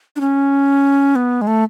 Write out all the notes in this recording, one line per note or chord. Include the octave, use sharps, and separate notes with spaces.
D4
C#4
B3
G#3
A3